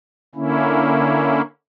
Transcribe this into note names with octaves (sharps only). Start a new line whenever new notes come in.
D3 A#3 C#4 E4